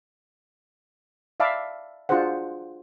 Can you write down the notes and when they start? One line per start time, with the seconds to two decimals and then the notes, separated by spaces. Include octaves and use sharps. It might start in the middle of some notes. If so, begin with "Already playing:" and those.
1.40 D5 E5 F5 A5 B5 D6
2.09 D4 F4 F#4 G#4 C5 F#5